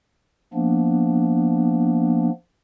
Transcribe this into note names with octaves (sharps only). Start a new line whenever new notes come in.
F3 A#3 B3 D4